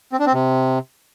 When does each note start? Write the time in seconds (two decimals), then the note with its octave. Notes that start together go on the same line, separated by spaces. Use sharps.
0.12 C4
0.19 D4
0.26 C4
0.33 C3